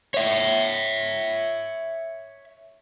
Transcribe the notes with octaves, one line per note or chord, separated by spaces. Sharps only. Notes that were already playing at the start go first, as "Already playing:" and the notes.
C#5 E5